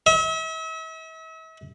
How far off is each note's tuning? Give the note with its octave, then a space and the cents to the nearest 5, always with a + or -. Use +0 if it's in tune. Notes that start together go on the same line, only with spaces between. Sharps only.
E5 -40